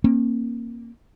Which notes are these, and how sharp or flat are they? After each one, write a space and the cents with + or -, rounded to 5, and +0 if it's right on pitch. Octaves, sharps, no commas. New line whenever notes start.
A#3 +0 C#4 -45